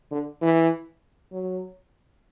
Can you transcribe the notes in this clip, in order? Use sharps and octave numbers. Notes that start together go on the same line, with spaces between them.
D3
E3
F#3